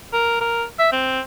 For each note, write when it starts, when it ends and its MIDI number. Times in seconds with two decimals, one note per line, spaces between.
0.13 0.37 70
0.41 0.64 70
0.79 0.88 76
0.93 1.20 60